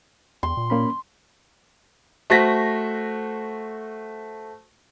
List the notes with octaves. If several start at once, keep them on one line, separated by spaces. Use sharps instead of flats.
E2 C6
A#2
A#3 C#4 B5
A3 F#4 C5 A#6 B6